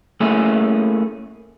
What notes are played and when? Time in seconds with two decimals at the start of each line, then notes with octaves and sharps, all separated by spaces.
0.20 A3 A#3 C#4 E4 G#4